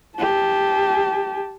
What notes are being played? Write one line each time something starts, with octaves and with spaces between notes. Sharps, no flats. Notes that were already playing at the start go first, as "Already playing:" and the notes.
G4 A5